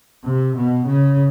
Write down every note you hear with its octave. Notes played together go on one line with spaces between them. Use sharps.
C3
B2
C#3